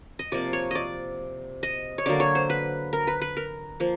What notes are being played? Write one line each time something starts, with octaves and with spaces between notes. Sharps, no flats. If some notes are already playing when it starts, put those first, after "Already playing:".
D#5
C3 F3 A#3 D5
C#5
D5 D#5
D#5
C#5
D3 F#3 A#3 D5
C#5
C5
B4
A#4
B4
B4
A#4
F3 A#3